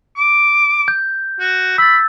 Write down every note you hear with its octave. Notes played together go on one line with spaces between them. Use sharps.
D6
G6
F#4
B5 E6 A6